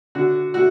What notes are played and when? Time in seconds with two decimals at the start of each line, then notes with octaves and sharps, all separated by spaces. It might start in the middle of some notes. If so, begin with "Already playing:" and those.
0.15 D3 F#4
0.54 A3 F#4